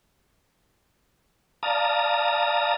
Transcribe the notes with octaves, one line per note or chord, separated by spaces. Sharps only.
D5 F5 A5 A#5 D#6